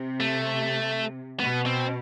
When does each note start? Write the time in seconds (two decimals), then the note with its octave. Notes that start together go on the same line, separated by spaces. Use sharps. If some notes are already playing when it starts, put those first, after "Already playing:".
Already playing: C3
0.20 A3
1.40 B2 B3
1.66 C4